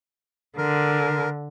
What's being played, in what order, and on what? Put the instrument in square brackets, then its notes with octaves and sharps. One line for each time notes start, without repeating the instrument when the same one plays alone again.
[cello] D3 [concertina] A#4